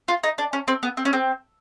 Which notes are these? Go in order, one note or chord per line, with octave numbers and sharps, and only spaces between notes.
F4
D#4
D4
C#4
C4
B3
C4
C#4
C4